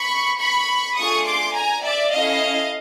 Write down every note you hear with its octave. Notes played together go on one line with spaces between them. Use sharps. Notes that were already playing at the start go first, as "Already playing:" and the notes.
Already playing: B5 C#6
B5 C#6
A3 D4 F4 G#4 C#6 D#6
C6 D6
G#5 A#5
D5 E5
C#4 E4 A4 D#5 F5